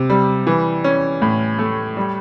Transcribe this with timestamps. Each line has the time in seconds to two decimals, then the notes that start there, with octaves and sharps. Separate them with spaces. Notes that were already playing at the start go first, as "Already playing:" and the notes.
Already playing: C3
0.10 G3
0.47 E3
0.84 C#4
1.22 A2
1.59 A3
1.97 G3